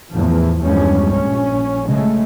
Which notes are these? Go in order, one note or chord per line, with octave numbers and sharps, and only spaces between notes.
E2 A2 F3
E2 G2 F3 G3 G#3 C#4
A#1 C#4
C#3 G#3 A3